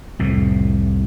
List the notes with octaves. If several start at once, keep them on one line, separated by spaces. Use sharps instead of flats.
C2 F2 A2